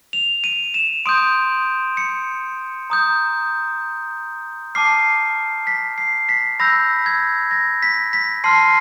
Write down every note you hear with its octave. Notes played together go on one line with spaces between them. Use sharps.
F7
D#7
E7
C6 D#6 G6 D7
C#7
A#5 D#6 G6
A5 D6 F6 C7
B6
C7
B6
B5 E6 G6 A#6
G#6
A#6
B6
B6
A5 C6 F6 C7